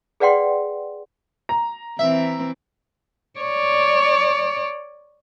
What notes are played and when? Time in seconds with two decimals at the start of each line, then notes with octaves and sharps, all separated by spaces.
0.20 G#4 B4 D5 F#5 G5 C6
1.49 A#5
1.99 E3 C4 E5
3.40 C#5 D5